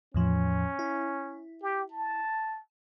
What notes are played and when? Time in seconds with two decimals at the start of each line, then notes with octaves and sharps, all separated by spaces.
0.14 E2 A2 F3 C#4
0.79 E4
1.63 G4
1.92 A5